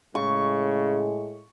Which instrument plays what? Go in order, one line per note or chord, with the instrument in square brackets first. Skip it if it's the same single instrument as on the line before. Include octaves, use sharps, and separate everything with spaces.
[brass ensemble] A2 G#3 [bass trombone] C#3 [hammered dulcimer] C#6